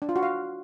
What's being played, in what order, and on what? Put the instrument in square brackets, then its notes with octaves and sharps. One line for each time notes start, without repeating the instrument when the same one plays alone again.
[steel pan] D4
F4
F#4
F5